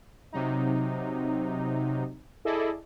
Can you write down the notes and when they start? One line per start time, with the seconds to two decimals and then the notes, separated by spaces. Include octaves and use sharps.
0.32 C3 F#3 D#4
2.45 E4 G#4 A4 D5 D#5